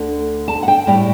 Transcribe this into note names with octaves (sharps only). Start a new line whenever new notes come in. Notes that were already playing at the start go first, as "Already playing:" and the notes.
Already playing: D2 D3
A5
F#5
G5
A2 G3 G5